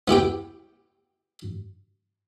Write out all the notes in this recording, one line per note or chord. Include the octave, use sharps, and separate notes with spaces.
B3 E4 G4 G5